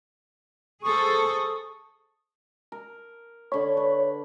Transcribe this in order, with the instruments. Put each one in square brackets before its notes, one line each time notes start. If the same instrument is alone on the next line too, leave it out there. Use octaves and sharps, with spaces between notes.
[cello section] G#4 A4 C5 [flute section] C#6 D#6
[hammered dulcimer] A#4
[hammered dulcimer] D3 B5 [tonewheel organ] C#5
[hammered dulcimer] B4